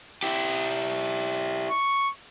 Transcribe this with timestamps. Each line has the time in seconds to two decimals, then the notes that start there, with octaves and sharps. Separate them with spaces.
0.23 E4 G4
1.71 C#6